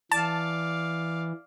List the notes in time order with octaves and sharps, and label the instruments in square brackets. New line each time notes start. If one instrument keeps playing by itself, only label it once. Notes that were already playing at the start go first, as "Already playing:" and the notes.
[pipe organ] E3 [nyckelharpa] D5 F5 [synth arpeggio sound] A5